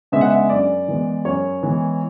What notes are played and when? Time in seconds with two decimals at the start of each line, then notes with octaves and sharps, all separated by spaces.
0.12 C#3 G#3 B3 D4 E5
0.21 F#5
0.30 E5
0.49 F#2 D5
0.88 E3 G#3 B3
1.25 F#2 C#5
1.63 E3 G#3 B3